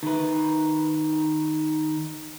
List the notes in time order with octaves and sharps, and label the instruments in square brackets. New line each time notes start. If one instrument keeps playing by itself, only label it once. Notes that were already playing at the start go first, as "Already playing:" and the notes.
[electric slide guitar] D#3 B4